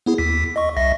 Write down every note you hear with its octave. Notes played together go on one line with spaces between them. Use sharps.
B3 E4 G#4
D#2 B6
D#5 C#6
C2 E5 A#6